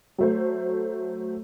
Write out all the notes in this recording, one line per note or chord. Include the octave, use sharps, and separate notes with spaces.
F#3 A3 C5